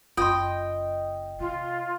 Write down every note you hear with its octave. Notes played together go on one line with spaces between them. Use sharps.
F#1 F4 D#5 G5 C6
C3 F4